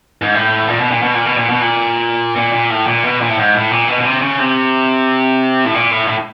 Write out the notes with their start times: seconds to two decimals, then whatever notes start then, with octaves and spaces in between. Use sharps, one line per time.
0.22 G#2
0.34 A2
0.68 A#2
0.79 B2
0.91 A#2
1.02 B2
1.14 A#2
1.26 B2
1.37 A#2
1.49 B2
1.60 A#2
2.36 A#2
2.53 A#2
2.70 A2
2.87 A#2
3.03 B2
3.21 A#2
3.29 A2
3.37 G#2
3.54 A2
3.71 A#2
3.88 B2
4.01 B2
4.05 C3
4.22 C#3
4.39 C3
5.65 A2
5.74 A#2
5.91 A2
6.07 A2